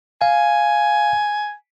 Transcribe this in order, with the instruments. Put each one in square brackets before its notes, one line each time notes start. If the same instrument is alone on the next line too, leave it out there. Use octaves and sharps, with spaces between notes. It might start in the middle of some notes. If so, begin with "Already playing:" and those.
[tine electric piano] F5 [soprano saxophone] G#5